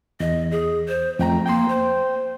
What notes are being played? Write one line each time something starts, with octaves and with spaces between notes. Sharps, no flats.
E2 D#5
G#4
C5
F2 A3 G5 A#5
A#3 G5 C6
C5